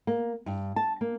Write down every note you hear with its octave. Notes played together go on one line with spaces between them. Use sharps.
A#3
G2
A5
A#3